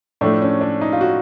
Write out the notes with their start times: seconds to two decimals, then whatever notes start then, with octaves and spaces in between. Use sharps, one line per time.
0.21 A2 F3 A3 D4
0.42 C#4
0.61 D4
0.81 D#4
0.92 F4
1.01 F#4